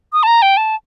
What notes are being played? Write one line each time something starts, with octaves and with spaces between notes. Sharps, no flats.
D#6
A5
A#5
G5
A5